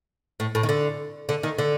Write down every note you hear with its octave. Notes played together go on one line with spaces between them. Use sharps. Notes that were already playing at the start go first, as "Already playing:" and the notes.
A2
A2
D#3
D3
D3
D#3
D3